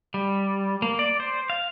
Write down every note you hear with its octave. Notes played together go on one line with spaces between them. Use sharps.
G3
A#3
D5
C5
F5